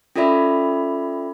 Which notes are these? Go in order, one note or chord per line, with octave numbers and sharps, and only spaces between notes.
C#4 F4 A4 D5 E5 B5